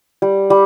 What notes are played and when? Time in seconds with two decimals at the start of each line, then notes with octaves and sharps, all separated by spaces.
0.22 G3
0.50 G3